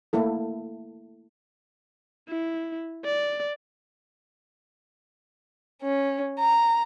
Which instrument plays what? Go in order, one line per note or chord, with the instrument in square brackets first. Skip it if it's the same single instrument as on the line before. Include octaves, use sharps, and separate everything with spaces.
[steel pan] A3 A#3 E4 A4
[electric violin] E4
D5
[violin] C#4
A#5